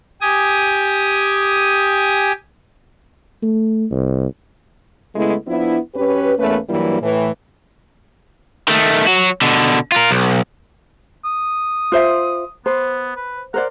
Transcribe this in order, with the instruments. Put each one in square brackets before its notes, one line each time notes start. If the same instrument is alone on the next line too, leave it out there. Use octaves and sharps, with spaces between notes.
[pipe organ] G4 G#5 D#6
[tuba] A3
C2
[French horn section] C#3 G#3 A3 B3 E4
F3 B3 D4 E4
F#2 C#4 G4 B4
E2 A3 A#3 C#4 B4
G2 E3 F#3 G3 A#3 E4
A2 E3
[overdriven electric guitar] D#3 A3
F#3 F#4
B2 D3
F4 A#4
B1
[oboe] D#6
[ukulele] F4 C5 E5
[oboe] B3 [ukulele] C5
[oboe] B4
[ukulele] A#4 C5 D5 [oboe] F#5